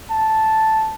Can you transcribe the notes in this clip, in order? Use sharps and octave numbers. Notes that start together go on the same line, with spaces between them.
A5